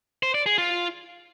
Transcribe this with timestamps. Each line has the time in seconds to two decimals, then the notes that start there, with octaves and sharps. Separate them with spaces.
0.23 C5
0.34 D5
0.46 G#4
0.58 F4